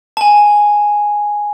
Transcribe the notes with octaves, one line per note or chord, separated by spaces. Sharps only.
G#5 A5